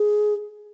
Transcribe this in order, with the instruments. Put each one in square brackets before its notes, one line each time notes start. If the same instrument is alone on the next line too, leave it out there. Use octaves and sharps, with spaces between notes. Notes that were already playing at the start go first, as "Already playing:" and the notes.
Already playing: [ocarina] G#4